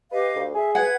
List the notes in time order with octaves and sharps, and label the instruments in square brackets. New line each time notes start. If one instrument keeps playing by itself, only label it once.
[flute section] G4 D#5 F5 [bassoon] B4
[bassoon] D2
[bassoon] G#4 [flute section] E5
[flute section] B4 G#6 [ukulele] F#5